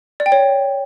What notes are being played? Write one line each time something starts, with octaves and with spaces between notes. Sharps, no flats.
D5
G5
C#5